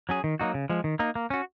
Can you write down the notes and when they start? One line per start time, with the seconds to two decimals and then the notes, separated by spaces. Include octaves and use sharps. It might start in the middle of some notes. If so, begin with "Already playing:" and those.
0.09 F#3 C#4 G#4
0.24 D#3
0.40 F#3 A#3 D#4 F#4
0.54 C#3
0.70 F3 G#3
0.84 D#3
0.99 A#3 D#4
1.15 A#3
1.30 C#4 F#4